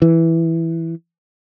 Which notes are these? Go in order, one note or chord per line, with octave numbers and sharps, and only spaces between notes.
E3